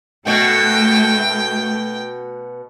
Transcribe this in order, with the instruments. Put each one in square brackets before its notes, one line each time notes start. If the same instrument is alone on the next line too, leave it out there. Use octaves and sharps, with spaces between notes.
[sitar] B2 F#4 [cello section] A3 [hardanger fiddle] G5